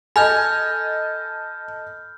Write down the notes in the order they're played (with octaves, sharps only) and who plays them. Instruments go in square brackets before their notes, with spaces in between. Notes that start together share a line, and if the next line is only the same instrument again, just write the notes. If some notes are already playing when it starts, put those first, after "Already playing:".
[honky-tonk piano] A4 D#5 [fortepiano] G#5 [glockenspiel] B5 F6 G6